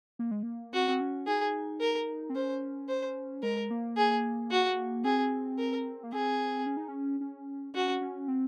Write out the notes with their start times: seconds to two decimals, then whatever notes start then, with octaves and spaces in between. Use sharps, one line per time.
0.19 A#3
0.31 G#3
0.43 A#3
0.73 C4 F#4
0.88 C4
1.00 C#4
1.27 D#4 G#4
1.81 A#4
2.30 C4
2.35 C#4 C5
2.88 C5
3.43 G#3 A#4
3.70 A#3
3.97 G#4
4.51 F#4
5.04 C4 G#4
5.59 A#4
6.03 A#3
6.13 C4 G#4
6.66 C#4
6.77 D#4
6.88 C#4
7.20 C#4
7.74 C#4 F#4
8.01 C#4
8.28 C4